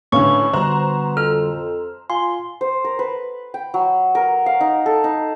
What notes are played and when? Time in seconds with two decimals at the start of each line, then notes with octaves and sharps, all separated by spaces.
0.12 A2 D3 C#4 E4 B4 F5 C#6
0.53 D3 G3 B3 F#4 C5 A#5 F#6
1.17 F2 A4 F6
2.10 F4 G#5 C6
2.61 C5
2.84 A#4
2.99 B4
3.54 G5
3.74 F#3
4.15 A#4
4.46 F5
4.61 D#4
4.86 A4
5.04 D#4